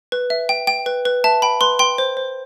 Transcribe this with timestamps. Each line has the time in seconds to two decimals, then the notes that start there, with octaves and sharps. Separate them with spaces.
0.12 B4
0.30 E5
0.49 G5
0.67 G5
0.86 B4
1.05 B4
1.24 E5 A5
1.42 G5 B5
1.61 B4 C6
1.79 G5 C6
1.98 C5
2.17 C5